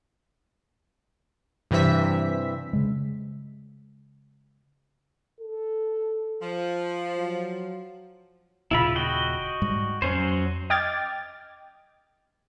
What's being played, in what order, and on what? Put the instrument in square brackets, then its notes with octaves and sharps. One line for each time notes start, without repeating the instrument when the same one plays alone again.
[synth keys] G2 C3 E3 C4 E5 B6
[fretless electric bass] C#3 G#3
[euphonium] A4
[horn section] F3
[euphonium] F#3
[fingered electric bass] D#1 A#2 C#3 [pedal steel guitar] E4 F4 B5
[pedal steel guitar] F#4 D#5 G5
[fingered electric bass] G#2 G3 G#3
[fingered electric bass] F2 [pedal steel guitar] F#3 C#4 C5
[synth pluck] D#5 G5 D6 F6 G#6 A6